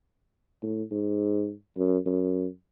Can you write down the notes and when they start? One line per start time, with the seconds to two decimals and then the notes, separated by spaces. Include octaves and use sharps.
0.63 A2
0.91 G#2
1.77 F#2
2.06 F#2